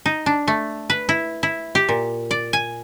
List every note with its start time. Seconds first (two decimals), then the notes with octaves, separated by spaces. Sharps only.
0.06 D#4
0.26 D4
0.48 A3
0.90 B4
1.09 E4
1.43 E4
1.75 G4
1.89 A#2
2.31 D5
2.53 G#5